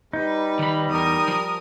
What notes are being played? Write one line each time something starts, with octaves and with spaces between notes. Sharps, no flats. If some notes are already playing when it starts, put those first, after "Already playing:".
G3 D#4 B4
D#3 B5
E2 A#4 D#6
F3